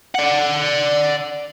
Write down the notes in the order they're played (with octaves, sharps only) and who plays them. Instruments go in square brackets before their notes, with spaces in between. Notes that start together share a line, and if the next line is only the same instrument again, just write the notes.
[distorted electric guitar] D5 F#5